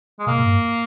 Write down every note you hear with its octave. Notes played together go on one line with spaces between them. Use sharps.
G#3
B2 A#3
G#2
G2